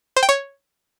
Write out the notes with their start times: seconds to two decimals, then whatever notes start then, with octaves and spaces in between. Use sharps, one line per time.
0.16 C5
0.23 G5
0.29 C#5